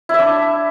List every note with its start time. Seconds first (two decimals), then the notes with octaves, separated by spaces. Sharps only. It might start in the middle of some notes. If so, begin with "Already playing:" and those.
0.09 E4
0.14 E5
0.19 D4